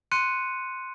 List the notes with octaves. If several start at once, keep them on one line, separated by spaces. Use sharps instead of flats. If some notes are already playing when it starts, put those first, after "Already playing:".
C6 F#6 C#7 D#7